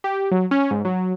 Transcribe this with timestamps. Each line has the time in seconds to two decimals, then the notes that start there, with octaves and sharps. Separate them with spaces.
0.04 G4
0.31 F#3
0.51 C#4
0.71 G#2
0.85 F#3